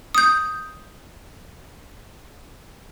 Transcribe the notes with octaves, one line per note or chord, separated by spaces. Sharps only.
D#6 G6